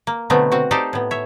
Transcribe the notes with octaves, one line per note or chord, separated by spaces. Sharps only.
A#3
B2 D3 F#3 A3 B3 C4
C4 F#4
D#4 G4 A4 C5 D5 D#5
A2 B3
C#5 E5